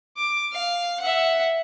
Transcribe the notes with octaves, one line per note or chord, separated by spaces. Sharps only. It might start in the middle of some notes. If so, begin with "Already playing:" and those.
D6
F5
E5 F#5